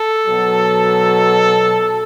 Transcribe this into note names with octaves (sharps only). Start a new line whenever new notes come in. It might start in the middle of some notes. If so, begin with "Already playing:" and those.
Already playing: A4
B2 F#3